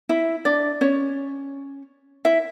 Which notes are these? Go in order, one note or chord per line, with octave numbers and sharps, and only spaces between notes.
E4 E5
D4 D5
C#4 C#5
E4 E5